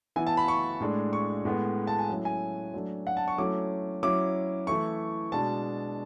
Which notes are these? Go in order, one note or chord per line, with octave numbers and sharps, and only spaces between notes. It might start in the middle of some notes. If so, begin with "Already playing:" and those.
E3 B3 E4 G#5
A5
B5
C#6
A2 G#3 D4
C#6
A2 G#3 B3
A5
G#5
F#3 A3 C#4 E4
G#5
F#3 A3 D4
F#5
A5
C#6
F#3 A3 C#4 E4 D6
F#3 C#4 E4 D6
E3 A3 E4 C#6
B2 G#3 D4 A5